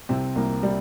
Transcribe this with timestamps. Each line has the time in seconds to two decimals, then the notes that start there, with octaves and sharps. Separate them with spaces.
0.09 C2 C3 C4
0.35 C2 A#3
0.63 G3